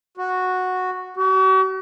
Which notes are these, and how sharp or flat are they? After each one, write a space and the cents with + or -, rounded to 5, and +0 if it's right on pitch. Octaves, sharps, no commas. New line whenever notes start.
F#4 -5
F#4 +45